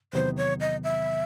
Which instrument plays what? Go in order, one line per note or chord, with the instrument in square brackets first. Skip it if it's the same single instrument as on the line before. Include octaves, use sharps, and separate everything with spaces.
[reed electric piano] E2 C3 D#3 F#3 B3 [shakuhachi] C5
[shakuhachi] C#5
D#5
E5